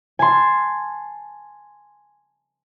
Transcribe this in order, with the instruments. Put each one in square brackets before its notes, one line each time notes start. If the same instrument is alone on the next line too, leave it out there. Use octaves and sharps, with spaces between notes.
[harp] G#5 A5 C6